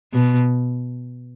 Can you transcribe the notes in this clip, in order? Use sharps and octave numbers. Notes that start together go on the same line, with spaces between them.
B2